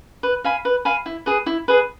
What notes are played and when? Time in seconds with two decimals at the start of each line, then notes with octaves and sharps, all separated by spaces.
0.23 B4
0.44 F5 G#5 B5
0.65 B4
0.85 F5 G#5 B5
1.06 E4
1.26 G#4 B4
1.46 E4
1.68 G#4 B4